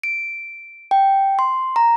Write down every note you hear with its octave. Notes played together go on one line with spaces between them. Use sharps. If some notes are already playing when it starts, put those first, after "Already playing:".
D7
G5
C6
A#5